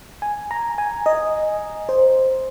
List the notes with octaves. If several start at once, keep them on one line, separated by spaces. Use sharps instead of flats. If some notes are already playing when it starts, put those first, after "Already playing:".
G#5
A#5
G#5
D#5
C5